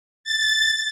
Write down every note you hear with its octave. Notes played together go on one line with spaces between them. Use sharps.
A6